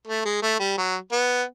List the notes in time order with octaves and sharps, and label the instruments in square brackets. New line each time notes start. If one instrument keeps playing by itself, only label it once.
[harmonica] A3
G#3
A3
G3
F#3
B3